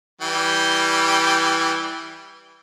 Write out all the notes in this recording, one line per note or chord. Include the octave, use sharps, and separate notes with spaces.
E3 G3 G5